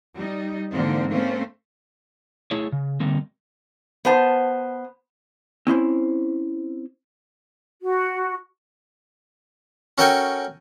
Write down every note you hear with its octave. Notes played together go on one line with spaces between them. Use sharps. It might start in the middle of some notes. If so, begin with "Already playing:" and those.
G3 D#4
G#2 D3 E3 A#3 C4
A3 A#3 C4 C#4
A3 E4 G#4 C#5
C#3
D3 G3 A3 A#3 C4
B3 C5 A5
C4 C#4 E4 C5
F#4
C#4 F#4 A4 A#4 G5 G#5